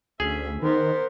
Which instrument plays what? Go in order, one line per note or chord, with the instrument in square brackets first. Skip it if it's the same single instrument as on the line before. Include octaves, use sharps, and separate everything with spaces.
[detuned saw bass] D2 [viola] C#4 E5 [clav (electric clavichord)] G#4
[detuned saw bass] D#3 [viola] B3 A#4 [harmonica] C5